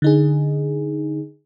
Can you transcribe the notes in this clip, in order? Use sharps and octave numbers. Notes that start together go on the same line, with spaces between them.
D3 D#4 G#4